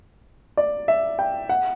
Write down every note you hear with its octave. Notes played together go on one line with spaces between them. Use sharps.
D5
E5
G5
F#5